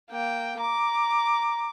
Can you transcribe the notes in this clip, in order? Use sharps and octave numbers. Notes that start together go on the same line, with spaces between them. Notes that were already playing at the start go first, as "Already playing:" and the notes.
A#3 G5
A#5 D6